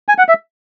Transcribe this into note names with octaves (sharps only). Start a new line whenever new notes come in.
G#5
F#5
E5